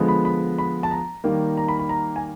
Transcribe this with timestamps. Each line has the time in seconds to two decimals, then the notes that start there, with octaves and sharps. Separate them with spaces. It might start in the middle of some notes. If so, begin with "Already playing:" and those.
Already playing: D3 F3 G#3 B3
0.08 B5
0.25 B5
0.59 B5
0.83 A5
0.91 A#5
1.24 D#3 G3 A#3
1.57 A#5
1.69 B5
1.79 B5
1.89 A#5
2.16 G#5